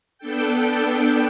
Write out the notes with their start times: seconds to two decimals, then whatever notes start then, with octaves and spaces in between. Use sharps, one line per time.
0.18 B3 D4 A4 G5